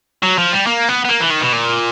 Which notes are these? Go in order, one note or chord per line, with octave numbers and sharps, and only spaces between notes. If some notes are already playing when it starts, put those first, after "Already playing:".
F#3
F3
G3
A#3
B3
B3
A#3
E3
D#3
B2
A#2